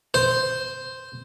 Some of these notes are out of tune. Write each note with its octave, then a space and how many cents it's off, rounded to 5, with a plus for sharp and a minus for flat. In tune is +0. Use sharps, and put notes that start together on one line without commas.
C5 -5